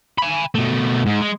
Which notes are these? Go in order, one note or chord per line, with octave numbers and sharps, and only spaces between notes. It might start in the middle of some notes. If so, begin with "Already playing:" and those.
G#5 B5
B2 A3
G#2
G#3